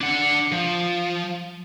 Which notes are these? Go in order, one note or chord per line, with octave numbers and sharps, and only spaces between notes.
D4 F#5
F3